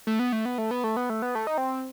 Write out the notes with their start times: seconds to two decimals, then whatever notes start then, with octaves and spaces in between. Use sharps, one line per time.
0.07 A3
0.19 B3
0.32 A3
0.45 B3
0.58 A3
0.71 B3
0.84 A3
0.97 B3
1.10 A3
1.22 B3
1.35 A3
1.47 D#4
1.58 C4